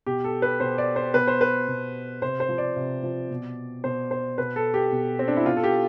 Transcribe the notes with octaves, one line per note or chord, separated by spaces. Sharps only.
B2 G4
A4
B4
B2 C5
D5
C5
B2 B4
C5
B4
B2
C3 C5
C5
F3
D5
C3
F3
B2
B2 C5
C5
B2 B4
A4
G4
B2
C4
D4
E4
B2 F4
A4
G4